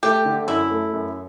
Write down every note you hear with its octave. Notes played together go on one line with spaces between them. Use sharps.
A3 G4
D3
F#2 E4
A3
F#2